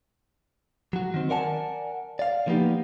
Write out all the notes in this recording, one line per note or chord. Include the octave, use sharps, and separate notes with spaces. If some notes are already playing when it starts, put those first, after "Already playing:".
F#3 F#4
D#3 C4
A#4 D5 F#5 G#5 A5
D5 F5
D3 F3 A#3 B3 D#4 G4